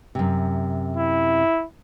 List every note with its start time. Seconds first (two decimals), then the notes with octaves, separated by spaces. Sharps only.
0.15 F#2 C3
0.97 E4